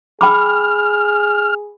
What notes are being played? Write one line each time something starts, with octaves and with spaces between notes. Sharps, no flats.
G#4 G5 B5 D6 F6